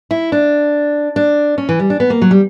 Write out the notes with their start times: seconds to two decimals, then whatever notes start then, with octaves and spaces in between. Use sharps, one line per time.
0.11 E4
0.32 D4
1.16 D4
1.58 C#4
1.69 E3
1.80 G3
1.90 D4
2.00 B3
2.10 A#3
2.22 F#3
2.31 G3